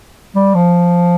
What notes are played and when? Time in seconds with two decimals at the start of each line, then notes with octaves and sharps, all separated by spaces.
0.35 G3
0.54 F3